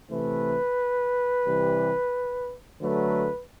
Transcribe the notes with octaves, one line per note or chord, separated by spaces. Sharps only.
C3 E3 A3 B4
C3 E3 G3
D3 F#3 A3 B4